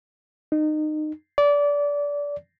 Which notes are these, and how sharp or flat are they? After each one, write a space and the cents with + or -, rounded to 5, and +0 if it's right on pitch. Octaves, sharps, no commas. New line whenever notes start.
D#4 -25
D5 -25